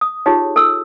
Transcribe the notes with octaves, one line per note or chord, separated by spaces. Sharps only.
D#6
D#4 F4 G4 G#4 C#5
A4 E6